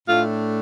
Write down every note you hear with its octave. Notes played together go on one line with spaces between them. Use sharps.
A2 A3 D4 F4